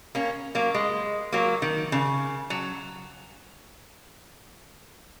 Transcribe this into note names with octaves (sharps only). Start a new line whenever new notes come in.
A#3 C#4
F#3 A#3
G#3
F#3 A#3
D#3
C#3
F#3